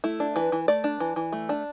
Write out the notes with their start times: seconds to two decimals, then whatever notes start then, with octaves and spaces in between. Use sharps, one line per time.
0.04 A3 E4
0.20 D4
0.36 E3 B4
0.52 E3
0.68 A3 D5
0.84 D4
1.00 E3
1.16 E3
1.33 A3
1.49 D4